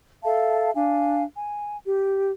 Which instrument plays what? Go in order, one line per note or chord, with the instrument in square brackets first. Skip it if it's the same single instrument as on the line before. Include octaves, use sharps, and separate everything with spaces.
[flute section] A4 E5 F5 A5
D4 F5 G#5
G#5
G4